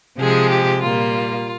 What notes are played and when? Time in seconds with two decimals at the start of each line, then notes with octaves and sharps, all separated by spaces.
0.18 C3 F3 G#3 G#4
0.50 G4
0.82 A#2 G3 A#3 F4